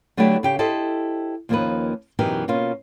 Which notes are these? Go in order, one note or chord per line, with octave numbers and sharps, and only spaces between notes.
D3 F#3 A3 B3 E4 G4
C#3 G4 G5
E4 G4 A4 C5 D#5
D#2 F3 A#3 C#4 D#4 B4
F#2 B2 E3 D#4 G4 A#4
B2 A#3 C#4 F4